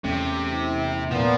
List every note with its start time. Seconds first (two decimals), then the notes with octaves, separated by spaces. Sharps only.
0.04 E2 C3 A3 C#4
0.51 E4
1.11 A#2 F3 B3